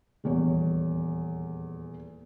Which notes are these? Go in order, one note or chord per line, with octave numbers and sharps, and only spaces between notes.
D#1 E2 C#5